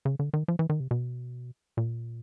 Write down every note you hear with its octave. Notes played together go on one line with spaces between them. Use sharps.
C#3
D3
D#3
F3
E3
D#3
C3
B2
A#2